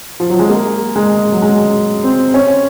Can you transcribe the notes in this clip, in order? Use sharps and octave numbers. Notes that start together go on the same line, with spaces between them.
F3
F#3
G#3
A#3
G#3
F#3
G#3
C4
C#4